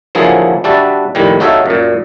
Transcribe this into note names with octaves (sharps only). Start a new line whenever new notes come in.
D3 F3 F#3 A#3 E4 G#4
G3 D4 F#4 E5 A5
F2 A2 D#3 G3
D#4 F#4 A4 C#5 E5 F5
F#2 A#2